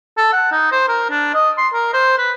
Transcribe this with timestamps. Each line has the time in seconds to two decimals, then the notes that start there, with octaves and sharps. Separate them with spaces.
0.17 A4
0.33 F#5
0.51 D#4
0.72 C5
0.88 A#4
1.10 D4
1.34 D#5
1.58 C6
1.73 A#4
1.94 C5
2.18 B4